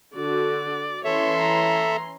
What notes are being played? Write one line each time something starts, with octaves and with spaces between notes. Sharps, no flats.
D3 F#4 D5
E3 C#4 A4 C#5 E5 C6
A#5